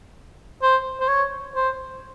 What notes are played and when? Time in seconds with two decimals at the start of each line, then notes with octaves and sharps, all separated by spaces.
0.63 C5
1.00 C5
1.09 C#5
1.55 C5